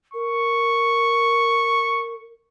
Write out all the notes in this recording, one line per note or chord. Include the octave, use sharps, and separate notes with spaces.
A#4 C#6